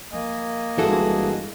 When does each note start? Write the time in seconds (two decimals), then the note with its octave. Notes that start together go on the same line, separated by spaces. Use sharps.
0.13 F3 A#3 D#5 G#5
0.78 G1 E3 F3 G#3 F#4 G#4 A4